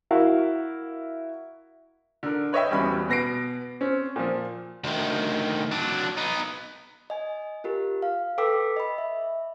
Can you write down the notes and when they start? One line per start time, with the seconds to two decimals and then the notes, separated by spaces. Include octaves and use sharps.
0.11 E4 F#4 A#4 F5
2.23 D3 A#4
2.53 B4 C#5 D#5 E5 G5
2.71 D1 E2 G3 C#4 B5
3.08 B2 B3 A#6 C7 D7
3.81 C4 C#4
4.16 A#2 F3
4.84 D2 D#3
5.72 F#3 D4
6.17 B3 D#4
7.10 D#5 G#5
7.64 F4 G4 A#4
8.02 F5
8.38 A4 B4 G5 D6 E6 B6
8.77 D#5 B5
8.98 E5